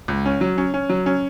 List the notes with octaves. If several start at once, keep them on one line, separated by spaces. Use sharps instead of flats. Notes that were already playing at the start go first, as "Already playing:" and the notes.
C#2
C#4
F#3
C#4
C#4
F#3
C#4